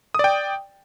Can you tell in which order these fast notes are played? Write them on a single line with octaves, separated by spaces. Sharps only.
D#6 D5 G5